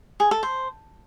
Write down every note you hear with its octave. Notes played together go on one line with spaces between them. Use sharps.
G#4
A4
C5